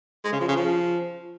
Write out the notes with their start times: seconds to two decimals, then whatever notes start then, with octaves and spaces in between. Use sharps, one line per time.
0.24 G#3
0.32 C#3
0.40 F3
0.48 C#3
0.56 F3